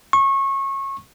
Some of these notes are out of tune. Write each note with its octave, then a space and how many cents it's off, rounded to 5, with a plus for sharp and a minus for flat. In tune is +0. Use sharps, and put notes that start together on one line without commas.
C#6 -25